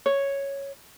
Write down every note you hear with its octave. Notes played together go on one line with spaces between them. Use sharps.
C#5